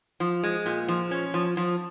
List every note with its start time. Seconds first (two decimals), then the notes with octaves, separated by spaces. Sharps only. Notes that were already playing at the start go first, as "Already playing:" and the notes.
0.20 F3
0.43 G#3
0.66 A#2
0.88 F3
1.11 C#4
1.34 F3
1.57 F3